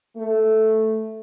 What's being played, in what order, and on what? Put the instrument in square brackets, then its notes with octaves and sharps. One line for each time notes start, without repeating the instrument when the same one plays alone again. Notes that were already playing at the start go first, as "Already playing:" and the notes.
[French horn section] A3